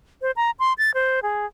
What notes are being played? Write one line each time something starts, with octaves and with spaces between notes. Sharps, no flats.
C5
A#5
C6
A6
C5
G#4